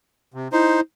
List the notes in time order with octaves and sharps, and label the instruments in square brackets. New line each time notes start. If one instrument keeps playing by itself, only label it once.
[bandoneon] C3
[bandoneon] D#4 C5 [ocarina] E4